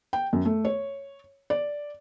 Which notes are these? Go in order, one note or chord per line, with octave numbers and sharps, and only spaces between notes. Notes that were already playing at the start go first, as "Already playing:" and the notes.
G5
F#2
A3
C#5
D5